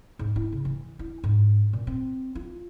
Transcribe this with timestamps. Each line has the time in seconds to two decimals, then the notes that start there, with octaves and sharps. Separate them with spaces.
0.19 G#2
0.36 E4
0.52 C#3
0.65 E3
0.99 E4
1.24 G#2
1.73 A#2
1.87 C4
2.35 F4